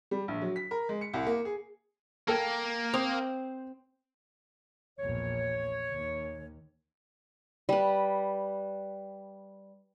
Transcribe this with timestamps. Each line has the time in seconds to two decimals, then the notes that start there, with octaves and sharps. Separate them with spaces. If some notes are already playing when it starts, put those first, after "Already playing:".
0.11 G3
0.28 A#1
0.42 F#3
0.56 B6
0.71 A#4
0.89 G#3
1.01 C#7
1.14 C2
1.26 A#3
1.45 G#4
2.28 A#3 A4 A#4 G5 G#6
2.94 C4 C5 D6 D#6 F7
4.99 A#1 E2 C#5
5.89 D#2
7.69 G3 B4